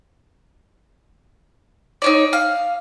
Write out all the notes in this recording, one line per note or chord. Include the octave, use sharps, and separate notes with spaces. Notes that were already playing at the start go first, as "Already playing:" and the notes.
D#4 C#5 D5
F5